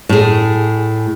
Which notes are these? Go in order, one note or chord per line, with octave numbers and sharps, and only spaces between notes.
A2 G#4